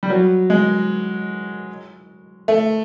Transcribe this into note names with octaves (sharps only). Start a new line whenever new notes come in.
G3
F#3
G#3
A3